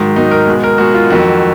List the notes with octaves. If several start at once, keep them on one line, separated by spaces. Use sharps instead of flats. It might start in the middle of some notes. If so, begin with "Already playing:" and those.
Already playing: G#2 D#3 F#3
G#2 D#3 F#3 D#4
A#4
B2 G#3
A#4
B2 G#3 F#4
F4
F2 D#3 F#3 F#4